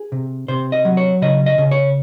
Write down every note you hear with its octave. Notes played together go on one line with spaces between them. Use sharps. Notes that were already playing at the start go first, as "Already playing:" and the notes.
Already playing: G#4
C3
C3 C5
D#5
F#3
C#5
C#3 D#5
D#5
C#3
C#5